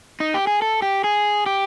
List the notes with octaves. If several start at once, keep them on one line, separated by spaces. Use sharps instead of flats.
D#4
G4
G#4
A4
G4
G#4
G4